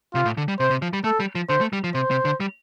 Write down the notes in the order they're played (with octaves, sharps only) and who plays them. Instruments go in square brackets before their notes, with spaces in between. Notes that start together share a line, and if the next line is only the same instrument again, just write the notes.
[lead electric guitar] C3 [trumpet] F4
[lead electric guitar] A2
D3
G3
[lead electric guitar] C3 [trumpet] C5
[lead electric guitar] C3
F3
G3
[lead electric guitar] A3 [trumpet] A4
[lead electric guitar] G3
F3
[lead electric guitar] D3 [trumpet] C5
[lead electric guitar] A3
G3
F3
[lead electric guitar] C3 [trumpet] C5
[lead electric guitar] C3
D3
G3